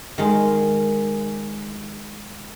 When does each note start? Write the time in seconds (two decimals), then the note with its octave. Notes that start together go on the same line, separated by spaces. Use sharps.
0.18 D#3 G#3